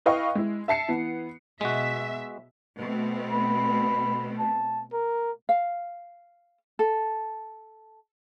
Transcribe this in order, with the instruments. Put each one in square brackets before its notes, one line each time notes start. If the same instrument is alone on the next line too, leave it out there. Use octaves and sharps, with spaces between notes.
[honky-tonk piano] E4 B4 D#5 F5 G5 C#6
G#3 E4
E5 A5 C7 C#7
E3 B3
[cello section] B2 E5 [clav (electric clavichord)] G#3 F#4
[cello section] B2 A3 C4
[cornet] B5
A5
A#4
[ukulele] F5
A4